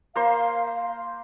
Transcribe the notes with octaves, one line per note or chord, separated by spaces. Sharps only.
A#3 C5 F5 C6